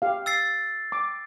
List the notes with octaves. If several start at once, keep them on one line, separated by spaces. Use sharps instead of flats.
G4 F5
E6 A6 C7
D6